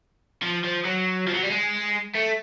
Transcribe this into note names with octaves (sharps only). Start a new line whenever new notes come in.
F3
F3
F#3
F3
F#3
G3
G#3
A3